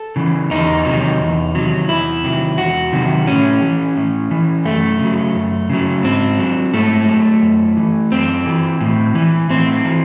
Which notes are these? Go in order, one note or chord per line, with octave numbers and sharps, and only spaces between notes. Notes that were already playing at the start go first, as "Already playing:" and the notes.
Already playing: A4
C#3 E3
E2 D#4
C3 D#3 F#3
E2
C3 D#3 F#3
E2 E4
C3 D#3 F#3
E2 F#4
C3 D#3 F#3
A2 C#4
E3
A2
E3
F#2 A3
C#3 F#3
F#2
C#3 F#3
G#2 C4
F#3
G#2 A3
F#3
F#2
E3
F#2 C4
E3
A2
E3
A2 C4
E3